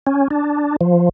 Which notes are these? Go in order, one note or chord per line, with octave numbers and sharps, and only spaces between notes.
C#4
D4
F3